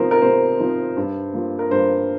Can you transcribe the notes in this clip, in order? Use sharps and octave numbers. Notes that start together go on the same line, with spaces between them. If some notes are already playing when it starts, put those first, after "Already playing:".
Already playing: C3 F3 C4 D#4 A#4 C5
A#4
C3 C5
F3 C4 D#4
G2
F3 A#3
A#4
G2 C5